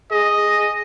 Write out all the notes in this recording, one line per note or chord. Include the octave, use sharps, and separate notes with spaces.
G#4 D#5